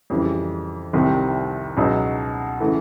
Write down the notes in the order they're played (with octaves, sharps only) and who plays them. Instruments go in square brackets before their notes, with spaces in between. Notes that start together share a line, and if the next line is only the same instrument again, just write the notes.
[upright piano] F2 C#3 E3 G3
C2 C3 D#3 G3 C4
C#2 B2 F#3 B3 D#4
C#3 E3 A3